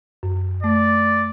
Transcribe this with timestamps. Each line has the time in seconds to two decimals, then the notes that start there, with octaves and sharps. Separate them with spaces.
0.23 F#2
0.63 A3 D5